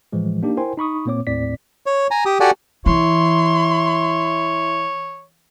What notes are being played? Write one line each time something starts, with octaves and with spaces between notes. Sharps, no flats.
A2 E3 F3 G#3
A#3 D4 D#4 G4
E4 A#4 C5 G5 G#5 C6
D#4 B5 C#6 D#6
A#2 A#3 C4 C#5 D6
D#2 A2 C4 D5 B6
C#5
G#5 A#5
G4 D#6
F#4 G4 A4 D5 F#5 G#5
E3 E4 C#5 C6